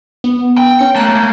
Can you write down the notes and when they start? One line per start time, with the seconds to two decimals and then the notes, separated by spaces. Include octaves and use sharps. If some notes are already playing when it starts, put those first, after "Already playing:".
0.24 B3
0.58 G5
0.79 C#4 C#7
0.96 A3 A#3 A5 F#6